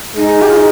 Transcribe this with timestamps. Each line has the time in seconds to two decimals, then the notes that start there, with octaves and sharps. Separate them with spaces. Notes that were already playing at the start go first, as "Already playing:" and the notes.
0.17 G#3 D#4
0.42 G4
0.48 F4
0.56 D#4